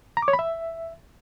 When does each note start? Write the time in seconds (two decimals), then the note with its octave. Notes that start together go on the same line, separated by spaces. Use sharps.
0.17 A#5
0.22 D6
0.28 C#5
0.33 B5
0.39 E5